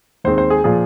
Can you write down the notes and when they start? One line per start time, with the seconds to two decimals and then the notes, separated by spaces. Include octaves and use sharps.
0.24 D#2 D#3 G#3 C4 C5
0.38 C5
0.50 G#4
0.64 A#2 F3 G#4